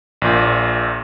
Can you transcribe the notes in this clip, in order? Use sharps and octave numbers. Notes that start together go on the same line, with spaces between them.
A#1 A#2